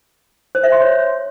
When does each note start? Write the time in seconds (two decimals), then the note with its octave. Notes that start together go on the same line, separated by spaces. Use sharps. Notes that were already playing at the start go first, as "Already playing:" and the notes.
0.55 C5
0.64 E5
0.72 C6
0.81 C#5